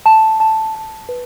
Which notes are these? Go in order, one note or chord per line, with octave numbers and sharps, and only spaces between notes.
A5
A5
A5
B4